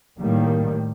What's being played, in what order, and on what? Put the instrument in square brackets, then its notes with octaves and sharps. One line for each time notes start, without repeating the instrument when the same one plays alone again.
[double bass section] A2 D#3 G3 A#3